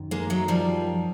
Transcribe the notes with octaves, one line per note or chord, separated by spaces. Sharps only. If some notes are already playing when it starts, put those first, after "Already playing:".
Already playing: F#2 D#3
G#3 A#3
F#3 G#3
F3 G3